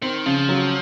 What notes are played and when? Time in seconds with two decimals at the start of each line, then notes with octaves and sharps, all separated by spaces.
0.02 D#3 C4
0.26 C#3 F3
0.49 F#3